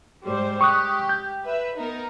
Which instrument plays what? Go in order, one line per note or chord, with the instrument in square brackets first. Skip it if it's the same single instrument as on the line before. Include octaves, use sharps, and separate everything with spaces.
[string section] G#2 G3 C5
[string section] G4 [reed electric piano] C#6 D#6 F#6
[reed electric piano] G6
[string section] B4 E5
B3 D#4 A#4